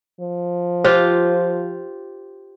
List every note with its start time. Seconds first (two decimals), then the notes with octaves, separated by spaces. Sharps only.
0.20 F3
0.84 F4 G4 C5